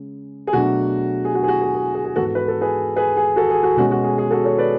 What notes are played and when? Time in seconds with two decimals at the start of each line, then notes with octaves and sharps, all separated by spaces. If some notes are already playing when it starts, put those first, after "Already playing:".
Already playing: C#3 G#3
0.47 G#4
0.53 B2 F#3 A3 D4 F#4
1.25 G#4
1.35 F#4
1.43 G#4
1.48 F#4
1.62 G#4
1.75 G#4
1.95 G#4
2.05 G#4
2.16 G#2 E3 B3 F#4 A4
2.35 B4
2.48 A4
2.61 G#4 B4
2.96 G#4 B4
3.17 G#4
3.36 F#4 A4
3.50 G#4
3.63 F#4
3.77 B2 G#3 C#4 F#4
3.91 F#4
4.04 G#4
4.18 G#4
4.31 F#4 A4
4.45 A4 C#5
4.58 B4 D5